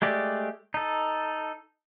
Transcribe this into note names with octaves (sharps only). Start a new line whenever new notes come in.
G#3 A3 G4 D5
D#4 A4